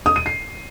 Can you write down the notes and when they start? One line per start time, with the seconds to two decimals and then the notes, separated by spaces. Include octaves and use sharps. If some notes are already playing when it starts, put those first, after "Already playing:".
0.06 D#6
0.16 D#7
0.26 C7